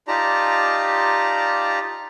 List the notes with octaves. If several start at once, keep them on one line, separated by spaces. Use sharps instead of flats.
D#4 F4 G4 D5 A5 A#5